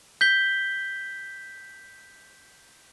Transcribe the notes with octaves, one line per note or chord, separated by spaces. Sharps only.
G6 B6 G7